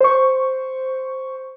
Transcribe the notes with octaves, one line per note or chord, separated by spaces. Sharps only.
C5 C#6